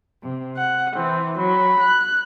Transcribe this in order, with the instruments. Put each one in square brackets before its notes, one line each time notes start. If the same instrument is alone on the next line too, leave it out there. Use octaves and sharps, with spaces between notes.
[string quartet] C3
F#5
[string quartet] E3 [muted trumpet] C4
[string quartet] F#3 [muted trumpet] B5
[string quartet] F#6